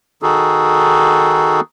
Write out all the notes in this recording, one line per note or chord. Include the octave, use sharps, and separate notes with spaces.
D#3 D#4 F#4 G#4 A4